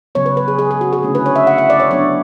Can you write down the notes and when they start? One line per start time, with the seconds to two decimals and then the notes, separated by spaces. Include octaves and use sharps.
0.15 C#3 F#3 B3 C#5
0.26 B4
0.37 B4
0.48 G#4
0.59 G#4
0.71 G#4
0.81 F#4
0.93 G#4
1.03 D3 A3 C#4 E4
1.15 B4
1.26 C#5
1.36 E5
1.47 F#5
1.58 E5
1.70 D5
1.80 C#5
1.91 F#3 B3 D4 C#5